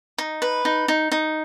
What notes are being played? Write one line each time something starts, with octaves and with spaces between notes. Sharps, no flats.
D#4
B4
D#4
D#4
D#4